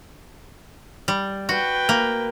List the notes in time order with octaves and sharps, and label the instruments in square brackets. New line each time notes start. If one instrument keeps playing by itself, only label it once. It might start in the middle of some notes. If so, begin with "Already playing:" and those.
[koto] G3
[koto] F#4 [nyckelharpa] B4 G5
[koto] A#3